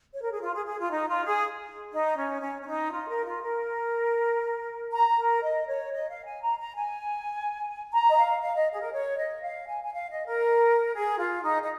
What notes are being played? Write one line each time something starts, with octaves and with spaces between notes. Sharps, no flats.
C#5
A#4
G#4
F4
G#4
G#4
F4
D#4
F4
G#4
D#4
C#4
C#4
C#4
D#4
F4
A#4
F4
A#4
A#5
A#4
D#5
C#5
D#5
F5
G#5
A#5
A#5
G#5
A#5
D#5
F5
F5
D#5
G#4
A#4
C#5
D#5
F5
G#5
G#5
F5
D#5
A#4
G#4
F4
D#4
D#4